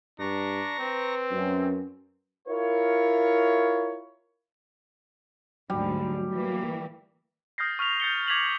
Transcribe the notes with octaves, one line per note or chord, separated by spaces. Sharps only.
G2 D4 A#5 C#6 A#6
C4 B4
F#2 C#4
E4 F4 A#4 C#5
D2 G#2 D3 F#3 G3
E3 A#3
D#6 F6 G6 A6 A#6 C7
C#6 F6 B6 F7
G6 A6 C#7 G7
D6 G#6 B6 F7 F#7